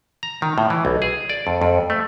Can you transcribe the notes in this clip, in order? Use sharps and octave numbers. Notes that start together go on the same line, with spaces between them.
A#5
D#3
A2
E3
B1
G#4
D5
F2
F2
A3